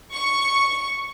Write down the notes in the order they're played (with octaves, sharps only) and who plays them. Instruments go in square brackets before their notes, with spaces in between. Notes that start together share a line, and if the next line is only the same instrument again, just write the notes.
[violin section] C#6